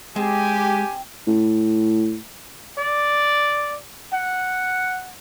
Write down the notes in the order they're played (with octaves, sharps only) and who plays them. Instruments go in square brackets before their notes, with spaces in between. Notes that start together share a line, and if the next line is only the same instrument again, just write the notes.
[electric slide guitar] G#3 [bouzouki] C4 [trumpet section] G4 G#5
[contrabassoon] A2
[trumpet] D5
F#5